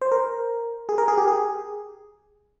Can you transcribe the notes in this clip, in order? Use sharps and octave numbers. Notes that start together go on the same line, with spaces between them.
C5
A#4
G#4
A#4
G#4
G4
G#4